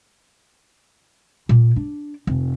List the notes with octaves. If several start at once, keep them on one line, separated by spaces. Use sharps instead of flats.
A#2
D4
F1